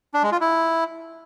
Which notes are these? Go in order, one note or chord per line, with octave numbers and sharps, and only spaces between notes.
D4
G#3
F4
E4